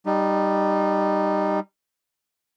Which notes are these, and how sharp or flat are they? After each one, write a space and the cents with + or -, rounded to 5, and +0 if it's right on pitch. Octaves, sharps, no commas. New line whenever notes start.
G3 +0 D#4 -20